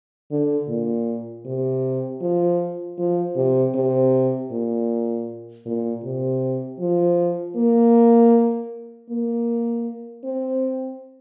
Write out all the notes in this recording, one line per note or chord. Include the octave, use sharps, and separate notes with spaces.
D3
A#2
C3
F3
F3
C3
C3
A#2
A#2
C3
F3
A#3
A#3
C4